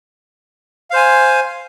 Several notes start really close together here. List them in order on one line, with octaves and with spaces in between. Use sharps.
F5 C5 G#5